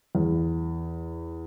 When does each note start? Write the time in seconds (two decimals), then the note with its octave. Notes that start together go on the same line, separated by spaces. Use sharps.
0.15 E2